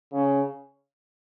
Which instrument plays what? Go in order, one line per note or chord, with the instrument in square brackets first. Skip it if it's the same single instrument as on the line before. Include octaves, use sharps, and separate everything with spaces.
[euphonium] C#3